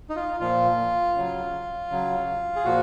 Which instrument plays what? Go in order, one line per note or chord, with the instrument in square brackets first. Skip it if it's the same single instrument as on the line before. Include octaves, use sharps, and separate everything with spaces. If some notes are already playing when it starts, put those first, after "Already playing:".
[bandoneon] D#4
F4
A#2 F3 F4
C#3 F#3
C#3 F#3
G#4
A#2 F3 F#4